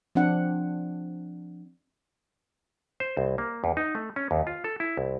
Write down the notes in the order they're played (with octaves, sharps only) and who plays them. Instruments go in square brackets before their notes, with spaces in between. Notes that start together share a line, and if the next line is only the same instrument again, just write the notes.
[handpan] F3 C4 D4 F#5
[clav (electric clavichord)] C5
C2
A#3
E2
D#4
A3
C#4
D#2
F4
A4
E4
C2